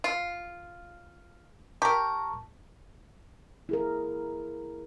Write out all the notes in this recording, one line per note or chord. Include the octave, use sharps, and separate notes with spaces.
F4
G4 A#4 A5 A#5 C#6
E4 G#4 A#4